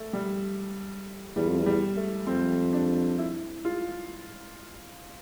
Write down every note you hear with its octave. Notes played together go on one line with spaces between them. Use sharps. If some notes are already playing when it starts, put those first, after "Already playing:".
Already playing: A3
G3
E2 G3
F2
E2
G3
A3
F2 C4
D4
E4
F4